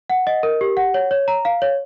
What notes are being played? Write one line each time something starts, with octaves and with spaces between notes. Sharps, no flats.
F#5
D#5
A#4
G4
F#5
C#5
C#5
A#5
F5
C#5